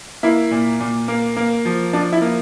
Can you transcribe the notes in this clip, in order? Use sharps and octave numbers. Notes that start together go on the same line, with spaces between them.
A#3 E4
A#2
A#2
A#3
A#3
F3
F3 D4
E4
A#3